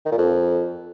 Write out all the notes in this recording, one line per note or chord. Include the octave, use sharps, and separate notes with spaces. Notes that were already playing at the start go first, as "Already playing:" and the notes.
D#3
A#2
F2